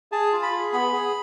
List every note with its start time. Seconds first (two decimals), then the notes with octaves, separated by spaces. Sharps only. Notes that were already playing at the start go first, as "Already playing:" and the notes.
0.12 G#4 A5
0.32 F4
0.43 B5
0.52 G#4
0.73 B3 B5
0.92 G#4